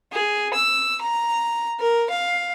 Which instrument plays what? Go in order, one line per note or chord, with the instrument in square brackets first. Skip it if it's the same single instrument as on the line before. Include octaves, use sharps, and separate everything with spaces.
[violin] G#4
E6
A#5
A#4
F5